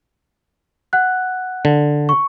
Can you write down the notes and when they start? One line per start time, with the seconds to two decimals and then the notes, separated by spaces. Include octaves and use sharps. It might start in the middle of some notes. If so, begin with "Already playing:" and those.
0.93 F#5 F#6
1.65 D3
2.09 C#6